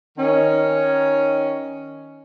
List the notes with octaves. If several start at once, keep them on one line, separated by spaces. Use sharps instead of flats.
D#3 C#4